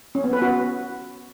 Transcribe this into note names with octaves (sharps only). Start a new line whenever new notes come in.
C#4
B3
B4
F#4